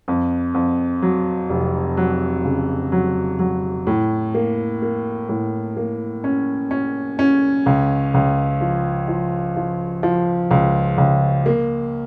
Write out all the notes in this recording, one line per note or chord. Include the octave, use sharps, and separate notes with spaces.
F2
F2
F#3
F1
F#3
C#3
F#3
F#3
A2
A#3
A#3
A2
A#3
C#4
C#4
C#4
C#2
C#2
F3
F3
F3
F3
C#2
C#2
A#3